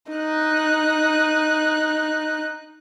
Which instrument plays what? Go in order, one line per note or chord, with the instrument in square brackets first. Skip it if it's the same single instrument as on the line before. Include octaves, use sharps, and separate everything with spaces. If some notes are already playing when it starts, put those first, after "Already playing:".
[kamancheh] D#4 F#6